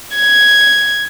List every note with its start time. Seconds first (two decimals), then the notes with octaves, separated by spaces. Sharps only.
0.16 G#6